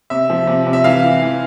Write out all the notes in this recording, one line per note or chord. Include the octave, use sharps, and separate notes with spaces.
C3 E5
F3
C3
C3
E5
E3 F5
E3
E3